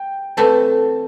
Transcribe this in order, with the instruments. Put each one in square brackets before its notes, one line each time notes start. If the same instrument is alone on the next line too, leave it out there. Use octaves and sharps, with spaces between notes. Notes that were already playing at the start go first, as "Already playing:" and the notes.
Already playing: [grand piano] G5
[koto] E3 A3 C4 [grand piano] A5